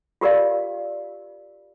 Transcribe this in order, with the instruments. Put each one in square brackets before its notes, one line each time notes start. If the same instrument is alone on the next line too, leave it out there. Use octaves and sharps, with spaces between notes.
[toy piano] F4 G4 A#4 D5 F5